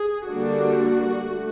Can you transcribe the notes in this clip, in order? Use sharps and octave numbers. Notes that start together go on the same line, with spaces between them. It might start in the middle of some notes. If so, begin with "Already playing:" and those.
Already playing: G#4
D3 G3 A#3 D4 F#4
A3